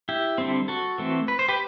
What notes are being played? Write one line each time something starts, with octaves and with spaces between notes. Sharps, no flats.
E4 G4
D3 G3 C4
F#4 A4
E3 A3 C4
B4
C5
G4 B4